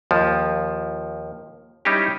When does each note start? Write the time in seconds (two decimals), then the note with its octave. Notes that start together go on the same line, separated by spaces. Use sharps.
0.11 D#2 F3
1.85 G3 C#4 D#4 E4 G4